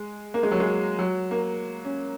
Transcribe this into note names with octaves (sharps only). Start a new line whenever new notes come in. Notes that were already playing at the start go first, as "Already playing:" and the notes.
Already playing: G#3
A#3
G#3
F#3
G#3
F#3
A#3
C#4